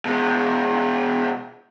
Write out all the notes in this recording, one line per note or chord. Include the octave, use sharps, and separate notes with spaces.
B2 G#3